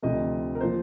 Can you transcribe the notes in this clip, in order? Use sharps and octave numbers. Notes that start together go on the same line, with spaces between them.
D2 C3 F3 D#5
A#4
A#2 F3 C5